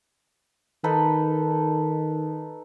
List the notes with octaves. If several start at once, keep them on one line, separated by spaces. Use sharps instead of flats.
D#3 D#4 A4 B4